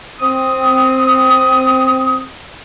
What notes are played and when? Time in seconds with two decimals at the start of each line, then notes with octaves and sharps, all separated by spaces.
0.20 C4 D#6